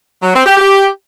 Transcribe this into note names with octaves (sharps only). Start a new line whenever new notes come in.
F#3
C4
G4
G4